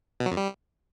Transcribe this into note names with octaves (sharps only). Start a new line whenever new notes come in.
B2
F#3
F2
G3